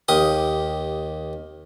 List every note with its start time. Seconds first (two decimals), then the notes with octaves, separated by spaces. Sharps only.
0.08 D#2 G4 D#6